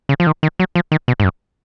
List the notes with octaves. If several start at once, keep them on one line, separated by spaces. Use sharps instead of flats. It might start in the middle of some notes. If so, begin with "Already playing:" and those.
C#3
F3
D#3
D#3
F#3
F3
D#3
B2
G#2
F#2